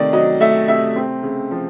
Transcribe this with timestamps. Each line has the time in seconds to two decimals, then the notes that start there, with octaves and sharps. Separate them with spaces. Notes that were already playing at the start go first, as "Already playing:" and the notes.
Already playing: C3 D#3 A3 D5
0.13 F#3 D#5
0.40 A3 E5
0.68 C3 E5
0.96 C4
1.23 C#3
1.51 F3